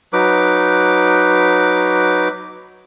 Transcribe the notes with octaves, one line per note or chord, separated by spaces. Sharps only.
F#3 D#4 B4 D6